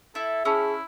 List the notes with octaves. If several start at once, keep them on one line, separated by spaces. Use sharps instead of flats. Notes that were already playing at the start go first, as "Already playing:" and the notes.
E4 A4
C#4 E4 G#4 A5 E6